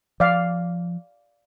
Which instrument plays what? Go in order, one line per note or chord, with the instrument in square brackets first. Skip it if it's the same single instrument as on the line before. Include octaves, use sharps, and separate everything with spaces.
[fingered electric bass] F3 [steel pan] D5 F5